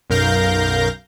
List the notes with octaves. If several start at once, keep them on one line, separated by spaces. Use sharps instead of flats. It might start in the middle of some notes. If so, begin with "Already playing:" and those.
B1 F#2 A#4 F5 G6 A#6